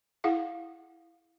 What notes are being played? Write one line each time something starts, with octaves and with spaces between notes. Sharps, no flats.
E4 G#4 F5 F#5